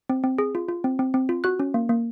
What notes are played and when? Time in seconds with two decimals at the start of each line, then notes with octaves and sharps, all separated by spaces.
0.09 C4
0.24 C4
0.38 G#4
0.55 F4
0.69 F4
0.84 C4
0.99 C4
1.14 C4
1.29 F4
1.44 F#4 F#6
1.59 C#4
1.74 A#3
1.89 A#3